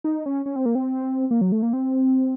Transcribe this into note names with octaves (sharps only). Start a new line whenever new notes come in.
D#4
C#4
C#4
C4
A#3
C4
A#3
F#3
A3
A#3
C4